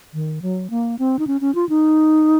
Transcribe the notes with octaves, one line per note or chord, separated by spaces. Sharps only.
D#3
F#3
A#3
C4
D#4
C#4
C#4
F4
D#4